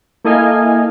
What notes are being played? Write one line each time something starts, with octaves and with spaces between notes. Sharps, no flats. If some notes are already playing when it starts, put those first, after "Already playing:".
A#3 E4 A4 D#5 F5 G#5